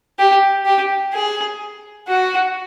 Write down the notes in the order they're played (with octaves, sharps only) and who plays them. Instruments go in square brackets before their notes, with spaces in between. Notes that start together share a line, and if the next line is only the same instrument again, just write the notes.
[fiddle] G4
G4
G#4
F#4